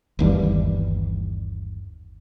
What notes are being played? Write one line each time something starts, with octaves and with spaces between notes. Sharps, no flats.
G1 D#2 E3 G3